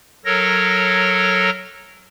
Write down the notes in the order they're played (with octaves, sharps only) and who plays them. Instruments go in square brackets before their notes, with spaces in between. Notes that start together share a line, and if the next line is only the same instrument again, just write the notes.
[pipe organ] F#3 A4 A#4 C#5 A#6